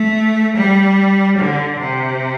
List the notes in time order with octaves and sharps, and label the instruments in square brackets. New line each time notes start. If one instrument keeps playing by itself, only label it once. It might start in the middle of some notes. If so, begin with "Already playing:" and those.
Already playing: [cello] A3
G3
D3
C3